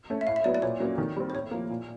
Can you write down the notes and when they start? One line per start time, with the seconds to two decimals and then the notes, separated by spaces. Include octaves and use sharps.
0.10 A3 C#4
0.21 E5
0.27 A2 F5
0.36 E5
0.44 F#3 B3 E4 D5
0.55 D5
0.62 A#2 C#5
0.80 F#3 A#3 C#4
0.98 D#3
1.16 G3 C4
1.30 C5
1.35 A2 C#5
1.51 F3 A#3
1.70 A#2